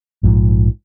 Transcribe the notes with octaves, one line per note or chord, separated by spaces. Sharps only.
A#1 G#2 F3